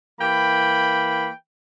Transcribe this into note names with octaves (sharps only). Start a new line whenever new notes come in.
E3 A#3 G5 B5